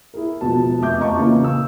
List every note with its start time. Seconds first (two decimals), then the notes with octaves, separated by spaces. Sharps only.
0.14 E4 G#4 A#4
0.41 E1 B2 F3 A5
0.81 F1 E5 D6 G6
0.99 D#5 F5 A5 A#5 C#6 D6
1.17 A#2 C#3 E3 A#3 F4
1.44 E6